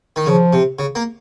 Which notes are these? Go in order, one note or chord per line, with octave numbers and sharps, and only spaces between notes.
D#3
C#3 F3
C3
C#3
A#3